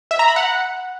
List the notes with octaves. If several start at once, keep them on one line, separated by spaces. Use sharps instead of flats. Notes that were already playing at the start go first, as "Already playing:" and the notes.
E5
A#5
B5
F#5